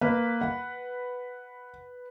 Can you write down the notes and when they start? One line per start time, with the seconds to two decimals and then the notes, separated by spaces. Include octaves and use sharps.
0.01 A#3 B4
0.41 F#5